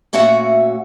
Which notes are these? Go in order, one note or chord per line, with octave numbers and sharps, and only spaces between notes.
A#2 A3 C#4 F#4 E5 F#5